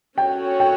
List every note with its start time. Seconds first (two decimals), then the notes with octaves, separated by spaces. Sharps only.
0.18 C#4 F#4 A4 C#5 G5
0.60 G5